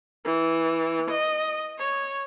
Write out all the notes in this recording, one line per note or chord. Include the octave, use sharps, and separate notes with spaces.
E3
D#5
C#5